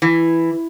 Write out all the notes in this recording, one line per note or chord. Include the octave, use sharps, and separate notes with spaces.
E3